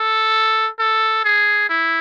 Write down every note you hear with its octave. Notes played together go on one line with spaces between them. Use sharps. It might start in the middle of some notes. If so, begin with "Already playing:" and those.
Already playing: A4
A4
G#4
E4